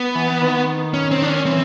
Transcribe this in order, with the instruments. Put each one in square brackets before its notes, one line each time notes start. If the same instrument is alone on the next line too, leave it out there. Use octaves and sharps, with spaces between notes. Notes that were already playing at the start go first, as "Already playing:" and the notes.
Already playing: [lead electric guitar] B3
[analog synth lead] E3
D#3
[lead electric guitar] C#4
C4
D4
C#4
[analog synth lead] E3 [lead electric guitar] C4